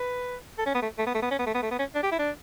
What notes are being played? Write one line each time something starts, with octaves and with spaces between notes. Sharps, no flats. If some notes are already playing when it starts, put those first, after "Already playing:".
Already playing: B4
A4
C#4
B3
A3
A3
B3
A3
B3
C#4
B3
A3
B3
A3
B3
C#4
D4
G4
E4
D4